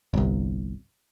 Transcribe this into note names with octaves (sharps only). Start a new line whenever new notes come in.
G1 C2